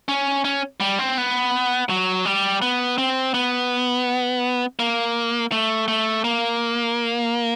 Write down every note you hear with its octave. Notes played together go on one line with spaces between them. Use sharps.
C#4
C#4
G3
C4
B3
F#3
G3
B3
C4
B3
A#3
A3
A3
A#3